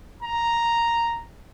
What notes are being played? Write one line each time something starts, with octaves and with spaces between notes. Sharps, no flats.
A#5